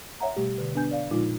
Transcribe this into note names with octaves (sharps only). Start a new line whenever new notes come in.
C#5 E5 F#5 A#5
B2 G3 A3 G4
B2 D3 B4
B3 D4 B4 G#5 G6
D5 F5
A#2 F3 G#3 D#4 F4